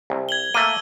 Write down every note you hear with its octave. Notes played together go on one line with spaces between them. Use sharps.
C2
G#6 F#7 G7
A3 A#3 E6 D#7